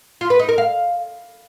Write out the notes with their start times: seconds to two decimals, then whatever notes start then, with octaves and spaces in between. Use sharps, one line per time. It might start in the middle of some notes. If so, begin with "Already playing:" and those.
0.21 F4
0.30 B4
0.39 D#4
0.49 A#4
0.58 F5